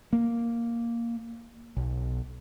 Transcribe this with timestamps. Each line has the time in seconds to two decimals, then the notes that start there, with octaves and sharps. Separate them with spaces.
0.13 A#3
1.77 B1